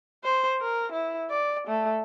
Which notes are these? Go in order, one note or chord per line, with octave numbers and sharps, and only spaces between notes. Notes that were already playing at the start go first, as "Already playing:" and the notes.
C5
A#4
E4
D5
A3